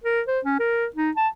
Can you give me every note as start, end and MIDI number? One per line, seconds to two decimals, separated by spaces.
0.04 0.21 70
0.27 0.40 72
0.45 0.59 61
0.60 0.86 70
0.96 1.11 63
1.16 1.28 81